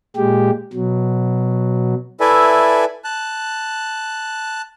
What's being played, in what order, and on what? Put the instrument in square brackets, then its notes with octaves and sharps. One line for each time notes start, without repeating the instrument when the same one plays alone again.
[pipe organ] A#2 G#3 G4
B2 F#3
[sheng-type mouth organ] E4 A4 B4 D5 E5 G#5
A5 F#6